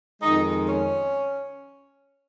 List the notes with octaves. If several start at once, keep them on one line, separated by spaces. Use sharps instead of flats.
F2 D#3 G#3 D#4
C#4